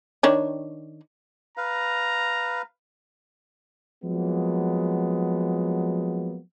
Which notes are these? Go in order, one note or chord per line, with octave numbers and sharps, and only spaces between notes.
D#3 D4 C#5
B4 F5 A#5
F3 F#3 G#3 A#3 B3